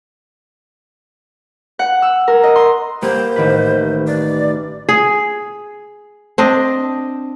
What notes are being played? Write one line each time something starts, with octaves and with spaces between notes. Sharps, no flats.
F#5
E6
A#4
D#5
C6
A#3 B3 G4 C5
A1 D#3 B4
D5
G#4
C4 D4 D#5